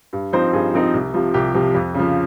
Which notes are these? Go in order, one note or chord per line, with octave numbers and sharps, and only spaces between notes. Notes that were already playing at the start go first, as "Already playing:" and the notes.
G2
F3 C4 D#4 C5
G2 G#4
F3 C4 D#4
C2
C3 F3
C2 G4
C3 F3
F2
C#3 F3